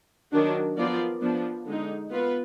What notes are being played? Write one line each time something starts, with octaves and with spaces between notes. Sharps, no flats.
D#3 F#3 D4 F#4
F3 B3 F4 A#4 D5
F3 B3 D4
D3 G#3 D#4
B3 F4 B4